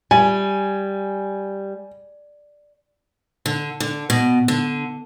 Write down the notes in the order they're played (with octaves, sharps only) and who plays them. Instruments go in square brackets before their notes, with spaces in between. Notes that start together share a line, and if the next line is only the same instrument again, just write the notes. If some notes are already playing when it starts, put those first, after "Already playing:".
[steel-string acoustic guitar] G3 [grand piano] G#5
[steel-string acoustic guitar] D3
D3
B2
D3